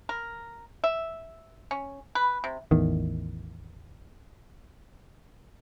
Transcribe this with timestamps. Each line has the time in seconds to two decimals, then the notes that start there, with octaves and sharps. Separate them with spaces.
0.09 A#4
0.84 E5
1.71 C#4
2.15 B4
2.44 C3
2.71 A1 E2 D#3